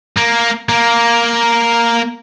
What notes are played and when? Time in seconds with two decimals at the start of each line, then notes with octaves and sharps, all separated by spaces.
0.17 A#3
0.69 A#3